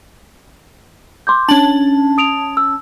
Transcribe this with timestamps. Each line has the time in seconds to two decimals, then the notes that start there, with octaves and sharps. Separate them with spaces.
1.27 C6 D6 G6
1.48 C#4 D4 A5 F#7
2.18 D#6 D7 F7
2.57 E6